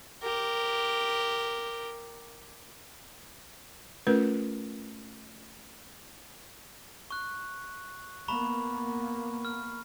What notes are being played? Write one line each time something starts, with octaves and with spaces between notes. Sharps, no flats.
G4 A#4
A3 C#4 F4 A#4 B4
C#6 F#6
A#3 B3 A#5 B5 C#6
F6